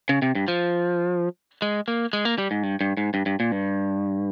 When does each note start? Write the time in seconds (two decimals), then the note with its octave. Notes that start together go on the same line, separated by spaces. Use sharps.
0.09 C#3
0.22 C3
0.35 G2
0.48 F3
1.62 G#3
1.88 A#3
2.13 G#3
2.25 A#3
2.38 G3
2.51 G#2
2.63 G2
2.81 G2
2.97 G#2
3.14 G2
3.26 G2
3.40 A#2
3.52 G2